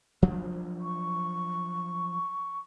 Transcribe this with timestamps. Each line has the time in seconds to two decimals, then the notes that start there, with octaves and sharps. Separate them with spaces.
0.22 F3 F#3 D4
0.80 C#6